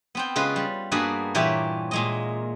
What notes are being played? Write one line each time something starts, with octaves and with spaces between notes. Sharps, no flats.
B3 C4 G5
C#3 G#3 F4 B4
G3
G2 A#3 B3 F#4 G#4 D5
A#2 E3 G4 C#5 D5 E5
A#2 G#3 D#5